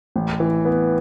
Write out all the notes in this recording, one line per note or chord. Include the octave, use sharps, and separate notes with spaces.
A1
E3
B3